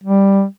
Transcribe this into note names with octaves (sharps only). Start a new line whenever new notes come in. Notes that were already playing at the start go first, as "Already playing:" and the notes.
G3